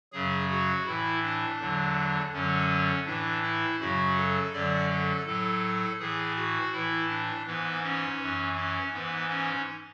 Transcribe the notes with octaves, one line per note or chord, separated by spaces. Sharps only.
F#2 C#3 F#3 G#4
F#4
A2 E3 E4
D4
E2 D3 F#3
F#2 D3 F#3 C#4
A2 E3 D4
E4
F#2 C#3 F#3 F#4
A4
F#2 D3 F#3 D5
A4
A2 F#3 A4
A2 E3 G#4
F#4
A2 E3 E4
D4
G#2 E3 B3
C#4
F#2 E3
C#4
G#2 E3 B3
C#4